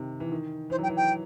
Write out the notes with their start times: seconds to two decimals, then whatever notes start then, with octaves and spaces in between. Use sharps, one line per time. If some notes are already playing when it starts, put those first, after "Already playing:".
Already playing: C3 D#3
0.20 E3
0.31 D#3
0.70 E3 C5
0.78 F#3
0.82 G5
0.88 E3
0.96 G5